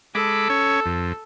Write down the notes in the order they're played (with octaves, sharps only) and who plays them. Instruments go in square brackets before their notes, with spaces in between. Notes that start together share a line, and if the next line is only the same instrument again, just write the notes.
[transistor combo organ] G#3 B5 D6 [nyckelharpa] A4
[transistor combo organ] C#4 C#5
F2